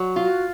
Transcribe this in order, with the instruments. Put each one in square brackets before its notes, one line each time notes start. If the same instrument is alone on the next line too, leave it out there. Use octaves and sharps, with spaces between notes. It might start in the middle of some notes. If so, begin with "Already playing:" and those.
Already playing: [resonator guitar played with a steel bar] F#3
F4
[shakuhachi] F#4